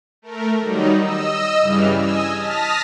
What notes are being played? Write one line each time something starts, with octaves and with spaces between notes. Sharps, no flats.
A3 A#4
D#3 F#3 G3 D#4
D#5 E6
G2 C#3 E3 G3 F6
D#5 G#5 E6
A5 D#6 F6 A#6 B6